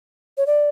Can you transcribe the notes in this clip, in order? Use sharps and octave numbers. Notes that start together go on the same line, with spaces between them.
C#5
D5